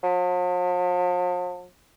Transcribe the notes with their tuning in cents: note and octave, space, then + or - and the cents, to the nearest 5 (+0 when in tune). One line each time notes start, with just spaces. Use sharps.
F3 +45